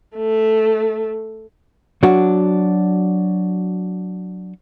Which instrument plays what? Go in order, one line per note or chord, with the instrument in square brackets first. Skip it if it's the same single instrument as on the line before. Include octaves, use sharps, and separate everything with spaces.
[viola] A3
[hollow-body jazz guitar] F#3 D4 F#4